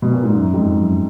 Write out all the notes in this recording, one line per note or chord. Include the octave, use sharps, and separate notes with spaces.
B2
A#2
G#2
F#2
F2 G#2
F#2